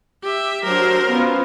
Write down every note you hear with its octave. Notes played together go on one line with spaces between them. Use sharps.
G4 E5
F#3 D4 A#4 C5
B3 C#4 F4